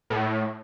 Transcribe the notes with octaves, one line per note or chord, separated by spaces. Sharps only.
A2